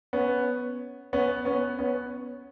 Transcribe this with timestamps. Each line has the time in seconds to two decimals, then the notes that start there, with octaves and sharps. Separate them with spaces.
0.13 B3 C#4
1.13 B3 C#4
1.45 B3 C#4
1.79 B3 C#4